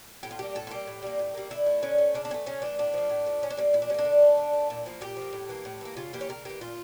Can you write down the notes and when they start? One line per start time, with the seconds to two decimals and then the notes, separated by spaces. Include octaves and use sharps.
0.23 A2 G4
0.31 F4
0.39 G3 A#3 G4
0.55 A2 A4
0.67 F4
0.71 G3 A#3 G4
0.87 A2
1.02 G3 A#3
1.19 A2
1.34 G3 A#3
1.50 D3 E4
1.66 A3
1.83 D3 C#4
1.98 A3
2.14 C#3 D4
2.25 D4
2.31 E3 C#4
2.34 A3
2.46 C#3 C#4
2.62 E3 A3 D4
2.79 A2 D4
2.94 F3 A3
3.10 A2
3.26 F3 A3
3.42 A#2 C#4
3.50 D4
3.57 G3 C#4
3.61 A#3
3.73 A#2 E4
3.82 D4
3.89 G3 C#4
3.94 A#3 D4
4.05 D3
4.22 A3
4.37 D3
4.53 A3
4.70 A#2 E4
4.86 F3 A#3
5.01 A#2 G4
5.17 F3 A#3
5.33 A2
5.49 E3 A#3
5.65 A2
5.81 E3 A#3
5.97 C#3 F4
6.13 E3 A#3 G4
6.21 C#5
6.29 C#3 A#4
6.45 E3 A#3 G4
6.61 A#2 F4